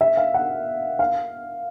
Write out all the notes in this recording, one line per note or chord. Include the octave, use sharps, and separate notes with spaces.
E5
F5
F#5
F5